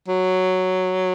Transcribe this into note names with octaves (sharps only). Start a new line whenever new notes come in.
F#3